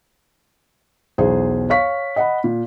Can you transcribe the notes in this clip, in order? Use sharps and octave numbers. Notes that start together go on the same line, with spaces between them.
B1 E2 G#4 C5
C#5 F5 C#6 B6
D#5 F#5 B5
A#2